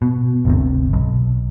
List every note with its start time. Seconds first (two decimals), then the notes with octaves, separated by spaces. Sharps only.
0.02 B2
0.45 G1 D2 C3
0.93 B1